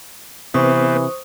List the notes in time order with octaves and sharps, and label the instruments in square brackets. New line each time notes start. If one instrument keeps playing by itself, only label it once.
[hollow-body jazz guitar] C3 [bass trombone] E3 [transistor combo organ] B3 C4 [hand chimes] C5 C#6 D#6